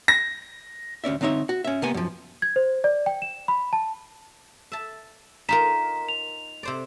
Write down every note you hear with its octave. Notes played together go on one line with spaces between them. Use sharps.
A#6
D2 C#4 D5 E5
D3 C4 D#4 C#5 E5
F#4
C#4 E5
C3 A#3 B3 G#5
F#2 F3
G#6
C5
D5
G5
E7
B5
A5
E5 A5
D#4 F4 A#4 A#5 B6 E7
F7
C3 C5 D5